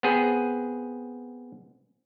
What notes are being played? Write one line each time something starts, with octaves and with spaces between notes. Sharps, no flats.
B3 C4 G#4